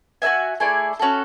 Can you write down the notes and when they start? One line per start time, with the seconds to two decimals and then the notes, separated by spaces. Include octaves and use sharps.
0.22 F#4 A4 E5 G#5
0.60 A3 E4 G#4 D5
0.99 C#4 F#4 A4